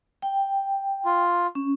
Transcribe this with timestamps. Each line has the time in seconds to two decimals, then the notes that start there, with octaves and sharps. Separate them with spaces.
0.22 G5
1.05 F4
1.55 C#4